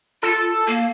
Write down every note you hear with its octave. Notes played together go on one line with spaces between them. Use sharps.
F4 A4
A#3